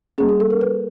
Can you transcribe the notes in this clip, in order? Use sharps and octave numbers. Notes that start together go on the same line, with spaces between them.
G3 A#3 C#4 G#4
G#4
A4
A#4
B4